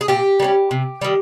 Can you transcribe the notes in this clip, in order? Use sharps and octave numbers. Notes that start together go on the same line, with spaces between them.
G#4
A#2 G4
G3 A#3 C#4
C3
D#3 G3